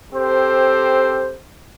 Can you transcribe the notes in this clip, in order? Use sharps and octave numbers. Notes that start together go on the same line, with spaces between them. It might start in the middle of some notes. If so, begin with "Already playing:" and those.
C4 G4 A4 C5